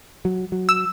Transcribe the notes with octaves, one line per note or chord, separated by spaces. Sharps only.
F#3
F#3
E6